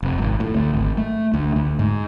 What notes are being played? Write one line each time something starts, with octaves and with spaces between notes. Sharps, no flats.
F1
G#1
A2
D2
G#1
A3
D2
D2
G#2